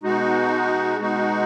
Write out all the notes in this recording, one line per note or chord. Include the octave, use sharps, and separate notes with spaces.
B2 G#3 D#4 F#4
B2 G#3 D#4 F#4